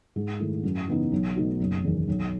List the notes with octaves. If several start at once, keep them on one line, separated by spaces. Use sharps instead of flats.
G#2
D#3 A3 E4
F#2
C#3 E3 B3 D#4
B1
B2 A3 D#4 F#4
F#1
E2 D#3
B1